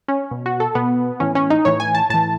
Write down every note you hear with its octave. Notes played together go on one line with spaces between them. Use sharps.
C#4
B2
F#4
A4
B2 B3
A2 E3 C#4
C#4
D#4
A2 E3 C#5
G#5
A5
A2 E3 A5